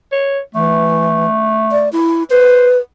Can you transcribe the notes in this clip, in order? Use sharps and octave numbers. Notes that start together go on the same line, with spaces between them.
C#5
E3 A3
D5
E4
B4 C5